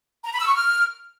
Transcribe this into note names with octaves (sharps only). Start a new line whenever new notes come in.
A#5
B5
E6
C#6
F6